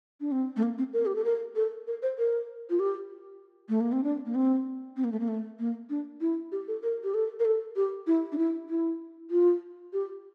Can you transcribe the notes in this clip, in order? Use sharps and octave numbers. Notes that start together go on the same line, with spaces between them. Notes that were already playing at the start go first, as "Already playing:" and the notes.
D4
C4
A3
A#3
C4
A#4
G4
A4
A#4
A4
A#4
C5
A#4
F4
G4
A3
A#3
C4
D4
A#3
C4
C4
A#3
A3
A#3
A3
A#3
D4
E4
G4
A4
A#4
G4
A4
A#4
A4
G4
E4
D4
E4
E4
F4
G4